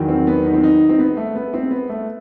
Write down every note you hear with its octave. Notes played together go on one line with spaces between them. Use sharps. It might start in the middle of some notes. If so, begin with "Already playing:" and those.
Already playing: E2 D#3 F#3
C4
B3
D#4
C4
D#4
C4
B3
A3
B3
C4
B3
A3